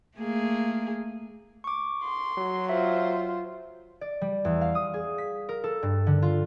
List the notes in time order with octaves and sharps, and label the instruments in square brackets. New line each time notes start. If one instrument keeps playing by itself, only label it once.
[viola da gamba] A3 A#3 G#4
[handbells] C#6 D6
[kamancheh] C6
[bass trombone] F#3
[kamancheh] F4 C5 [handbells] E5
[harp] D5
G3
E2
F5
D#6
G#4
B6
A#4
A4
G2
D3
F4